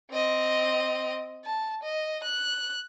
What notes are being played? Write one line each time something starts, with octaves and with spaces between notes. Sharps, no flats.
C4 D#5
A5
D#5
F#6